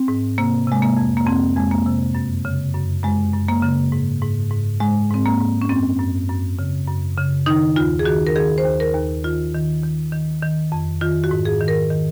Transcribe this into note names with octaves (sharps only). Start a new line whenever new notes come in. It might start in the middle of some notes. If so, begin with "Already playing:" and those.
Already playing: C4
G#2
C3 A#3
C3 G#3
A#3
F2
A#3
F2 C4
F2 G#3
A#3
C3
F#2
C#3
F#2
F#2 G#3
F#2
A#3
C#3
G#2
G#2
G#2
G#2 G#3
G#2 C4
A#3
G#2
C#4
F#2 C4
F#2
F#2
C#3
F#2
C#3
D#3 D#4
D#2 F4
G#4
D#3 F#4
A#4
D#3 G#4
C5
D#2
A#4
D#2
D#3 F4
D#3
D#3
D#3
D#3
F2
D#3 F4
F#4
G#2
G#4
D#3
A#4
D#3